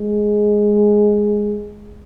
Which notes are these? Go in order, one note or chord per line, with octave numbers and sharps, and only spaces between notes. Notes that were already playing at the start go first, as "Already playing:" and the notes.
Already playing: G#3